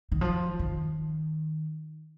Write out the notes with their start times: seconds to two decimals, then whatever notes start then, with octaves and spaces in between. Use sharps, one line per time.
0.12 D#3
0.21 F3
0.59 D#3